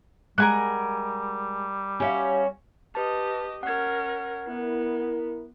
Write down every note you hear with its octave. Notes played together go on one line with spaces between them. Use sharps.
G3 G#3 A#4 F#5 G#5 F#6
C#4 F#4 G4 E5 F5
G4 B4 D#5 A5
C#4 A#4 F#5 G#6
B3 E4 A#4